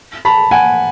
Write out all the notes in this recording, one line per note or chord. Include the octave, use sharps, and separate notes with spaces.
A5 B5
F#5 G#5